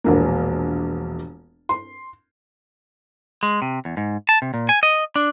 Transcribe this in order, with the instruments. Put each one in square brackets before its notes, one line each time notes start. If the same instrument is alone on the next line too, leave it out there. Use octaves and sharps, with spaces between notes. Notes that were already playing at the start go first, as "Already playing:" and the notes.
[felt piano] E1 A#1 A#3
C6
[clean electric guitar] G#3
C3
E2
G#2
A5
C3
A#2
G#5
D#5
D4